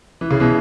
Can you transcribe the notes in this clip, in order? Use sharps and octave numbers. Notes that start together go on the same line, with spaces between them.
E3
C#3
B2 E3